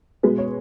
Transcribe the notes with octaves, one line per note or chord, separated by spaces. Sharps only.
B2 G#3 B4
C#5